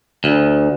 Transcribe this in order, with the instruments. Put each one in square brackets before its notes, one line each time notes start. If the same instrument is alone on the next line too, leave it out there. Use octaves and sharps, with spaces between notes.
[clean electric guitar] D2